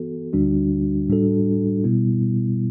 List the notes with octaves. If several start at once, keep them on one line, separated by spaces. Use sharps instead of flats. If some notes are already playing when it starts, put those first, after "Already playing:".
Already playing: E3 B3 F#4 A4
D2 D3 G3 D4 F#4
A2 G3 D4 F#4 A4
B2 G3 B3 E4